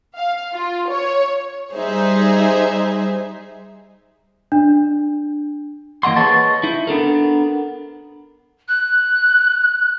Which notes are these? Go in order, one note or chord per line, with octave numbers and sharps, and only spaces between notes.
F5
F4
C#5
G3 D#4 G#4 C5 E5
D4
E3 A#3 D#5 F#5 C6
G#4 B4 C#5 D#5 A5
D#4 E4
B3 D4 A4 A#4
F#6